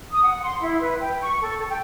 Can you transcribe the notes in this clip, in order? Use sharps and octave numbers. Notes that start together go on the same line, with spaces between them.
D#6
F#5
C6
E4
B4
G5
C#6
A4
G5